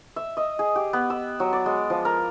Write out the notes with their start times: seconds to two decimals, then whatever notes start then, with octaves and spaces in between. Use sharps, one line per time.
0.16 E5
0.37 D#5
0.59 G#4
0.76 G4
0.93 B3
1.10 E6
1.40 F#3
1.53 D5
1.66 G#3
1.90 F3
2.05 A#4